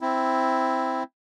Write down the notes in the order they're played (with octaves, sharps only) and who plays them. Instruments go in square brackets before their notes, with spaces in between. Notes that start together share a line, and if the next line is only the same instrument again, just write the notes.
[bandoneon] C4 E4